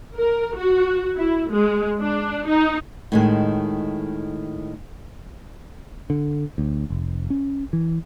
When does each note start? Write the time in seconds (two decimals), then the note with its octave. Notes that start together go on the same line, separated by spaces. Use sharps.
0.17 A#4
0.56 F#4
1.17 E4
1.51 G#3
2.00 D4
2.47 D#4
3.12 A2 D#3 G#3
6.10 D3
6.58 D2
6.90 F1
7.30 C#4
7.73 E3